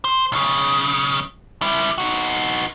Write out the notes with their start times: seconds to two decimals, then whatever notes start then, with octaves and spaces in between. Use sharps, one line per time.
0.04 C5
0.32 B1 C#3
1.62 G3 E4
1.98 D#4 F#4